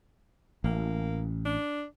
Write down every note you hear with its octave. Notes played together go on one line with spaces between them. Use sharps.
A1 A#3
D4